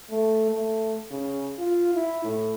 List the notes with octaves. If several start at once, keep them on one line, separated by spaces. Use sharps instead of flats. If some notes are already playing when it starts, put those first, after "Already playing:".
A3
A3
C#3
F4
E4
A2